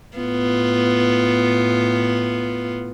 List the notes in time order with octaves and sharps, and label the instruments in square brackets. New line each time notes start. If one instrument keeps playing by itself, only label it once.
[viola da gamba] A2 B3 F4